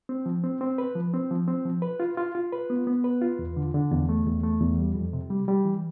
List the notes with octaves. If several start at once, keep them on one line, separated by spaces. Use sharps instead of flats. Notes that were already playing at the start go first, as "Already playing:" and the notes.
C4
F3
C4
C4
B4
F3
C4
F3
C4
F3
B4
F4
F4
F4
B4
B3
B3
B4
F4
E2
D3
D3
E2
A3
E2
A3
E2
G3
F2
C3
G3
G3
E3